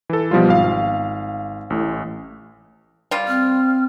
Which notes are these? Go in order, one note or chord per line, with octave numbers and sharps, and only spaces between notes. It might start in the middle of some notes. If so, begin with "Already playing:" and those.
E3 A4
B2 F3 G3 F4
G#1 F5
A1 A2
G3 F4
C4 F6